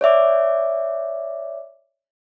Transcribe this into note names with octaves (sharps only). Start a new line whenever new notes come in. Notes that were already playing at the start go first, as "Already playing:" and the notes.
C#5 D5 E5 D6